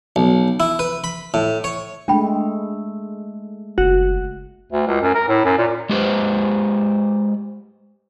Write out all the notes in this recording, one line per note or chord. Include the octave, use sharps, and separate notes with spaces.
B1
E4
B4
B5
A2
C#5
G#3 A3 D4 G5 B5
F#1 F#4
D2
C#2
F#2
A#4
A2
F#2
A#2
G#3 G4 B4 C5